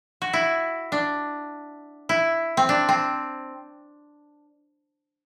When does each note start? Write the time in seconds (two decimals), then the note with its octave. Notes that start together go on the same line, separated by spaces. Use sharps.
0.22 F#4
0.33 E4
0.92 D4
2.09 E4
2.57 C4
2.69 D4
2.89 C4